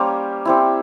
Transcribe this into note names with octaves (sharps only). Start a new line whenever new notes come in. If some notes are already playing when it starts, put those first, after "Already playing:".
Already playing: G3 A#3 C#4 A#4 C5
G3 C4 E4